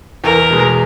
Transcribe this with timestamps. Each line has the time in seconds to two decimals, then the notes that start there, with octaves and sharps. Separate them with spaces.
0.24 E2 A#4
0.50 B2 G#3